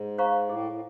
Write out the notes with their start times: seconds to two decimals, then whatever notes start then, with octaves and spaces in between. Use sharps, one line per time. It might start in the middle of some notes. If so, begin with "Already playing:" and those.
Already playing: G#2
0.18 C5 F5 A#5 C#6
0.49 A2 G#4
0.72 A2